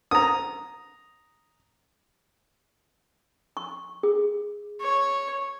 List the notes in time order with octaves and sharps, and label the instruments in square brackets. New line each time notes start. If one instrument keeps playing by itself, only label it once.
[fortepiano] A#5 D#6
[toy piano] C#6
G#4
[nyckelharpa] C#5